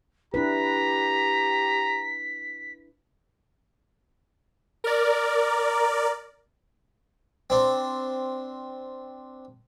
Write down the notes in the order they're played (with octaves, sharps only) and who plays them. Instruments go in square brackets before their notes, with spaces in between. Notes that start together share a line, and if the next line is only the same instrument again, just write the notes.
[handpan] D4 E4 B4 [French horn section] G4 [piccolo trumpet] A#5 [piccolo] B6
[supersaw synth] A#4 D5
[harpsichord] C4 D4